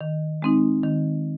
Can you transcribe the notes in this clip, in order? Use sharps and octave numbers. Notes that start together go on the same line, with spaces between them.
D#3
G#3 C4 D#4
D#3